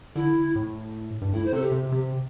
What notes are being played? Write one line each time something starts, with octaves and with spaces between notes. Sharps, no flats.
D3 E4
A2
G2
A2 E4
C5
C3 A4
G4
C3
C3 G4